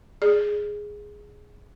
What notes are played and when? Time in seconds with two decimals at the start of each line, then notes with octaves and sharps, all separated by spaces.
0.22 G#4 D5